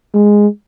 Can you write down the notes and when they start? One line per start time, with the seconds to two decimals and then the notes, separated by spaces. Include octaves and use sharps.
0.14 G#3